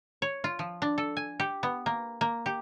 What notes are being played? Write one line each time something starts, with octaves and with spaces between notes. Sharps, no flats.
C#5
F4
F3
D4
A4
G#5
G4
B3
A#3
A#3
G4